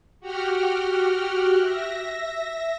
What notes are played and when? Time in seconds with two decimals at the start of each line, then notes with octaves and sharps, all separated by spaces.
0.20 F#4 G4 F#5 G5 F6
1.60 E5 A#6